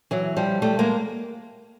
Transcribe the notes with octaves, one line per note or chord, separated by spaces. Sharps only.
E3 F#3
F3 G3
G3 A3
G#3 A#3